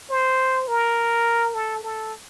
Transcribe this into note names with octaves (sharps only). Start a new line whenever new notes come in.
C5
A#4
A4
A4